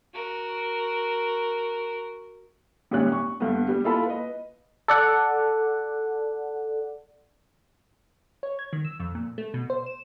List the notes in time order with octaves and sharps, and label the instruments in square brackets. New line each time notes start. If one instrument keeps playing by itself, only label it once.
[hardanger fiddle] F#4 A#4
[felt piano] G#1 A#2 G3 C#4 F#6
C#6
G2 D3 A3 B3
G3 B3 G4
E4 F4 A4 B5
B4 D#5
[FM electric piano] A4 D5 F#5
[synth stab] C#5
G#6
D#3
E6
F2
A#2
A3
B2
C5
E7